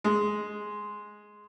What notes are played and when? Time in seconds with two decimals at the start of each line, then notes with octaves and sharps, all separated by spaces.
0.04 G#3